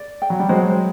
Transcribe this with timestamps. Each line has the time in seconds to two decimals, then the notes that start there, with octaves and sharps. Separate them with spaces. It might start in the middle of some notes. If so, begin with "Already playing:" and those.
Already playing: D5
0.22 G5
0.30 F#3
0.40 G3
0.49 F#3 G#3 C5